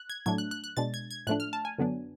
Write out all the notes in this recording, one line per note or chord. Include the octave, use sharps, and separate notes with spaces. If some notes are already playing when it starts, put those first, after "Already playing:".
Already playing: F#6
G#6
A2 F#3 A3 D4 G#6
F#6
F#6
F#6
B2 G#3 D4 A6
G#6
G#6
A2 F3 A3 D4 F#6
F6
A5
G#5
F#2 D3 F#3 B3 D4